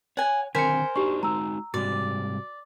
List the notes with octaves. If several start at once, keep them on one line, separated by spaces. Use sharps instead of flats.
C#5 F#5 G#5
D3 D#3 C4 A#4 C5 G#5 B6 C#7
D4 D#4 F#4 G4 C#6
G#3 D#4 F#4 A#5 E6
G#2 C3 G3 F#4 D5